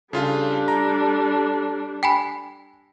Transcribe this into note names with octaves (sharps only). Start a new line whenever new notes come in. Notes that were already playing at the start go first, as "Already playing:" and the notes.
C#3 G3 D4 F4 A4 F5
A#5
G5 G#5 B5 B6